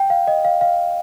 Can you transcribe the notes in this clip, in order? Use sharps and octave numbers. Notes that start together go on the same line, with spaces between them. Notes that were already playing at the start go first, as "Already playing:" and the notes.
Already playing: G5
F5
D#5
F5
F5